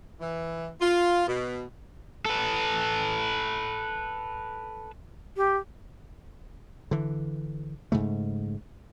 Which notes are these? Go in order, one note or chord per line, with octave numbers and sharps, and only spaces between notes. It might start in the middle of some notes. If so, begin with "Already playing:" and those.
E3
F4
B2
A4 B4
G4
D3 E3
G#2 C#3 A3